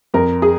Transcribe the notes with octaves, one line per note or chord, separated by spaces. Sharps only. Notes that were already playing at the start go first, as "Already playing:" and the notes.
F2 A#4
G#4